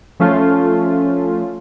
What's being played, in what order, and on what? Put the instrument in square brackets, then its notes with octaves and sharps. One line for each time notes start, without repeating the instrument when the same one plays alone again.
[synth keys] F3 A3 C#4 F4